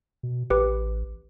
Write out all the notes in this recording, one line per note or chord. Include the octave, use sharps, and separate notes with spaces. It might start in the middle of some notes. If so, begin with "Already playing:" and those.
B2
A1 G4 B4 D6